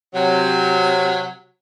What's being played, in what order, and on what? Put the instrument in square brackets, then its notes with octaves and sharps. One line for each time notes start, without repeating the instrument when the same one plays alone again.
[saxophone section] C3 F#3